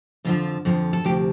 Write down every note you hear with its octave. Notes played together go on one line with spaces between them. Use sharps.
F2 D3 F3 F4
F2 D3 F3
A4
D2 C3 F3 G4